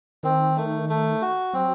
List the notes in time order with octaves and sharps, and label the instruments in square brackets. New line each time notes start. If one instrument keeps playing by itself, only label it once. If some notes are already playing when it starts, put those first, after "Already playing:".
[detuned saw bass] D#3 [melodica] C4
[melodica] A3
A3
F#4
[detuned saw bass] F#3 [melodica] C4